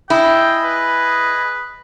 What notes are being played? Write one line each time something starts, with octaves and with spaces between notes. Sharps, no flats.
E4 G#4 D#5 G5
B4